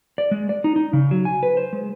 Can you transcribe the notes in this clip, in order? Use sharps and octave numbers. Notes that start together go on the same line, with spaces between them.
D5
G#3
D5
D#4
D#4
C#3
F#3
G#5
B4
C5
G#3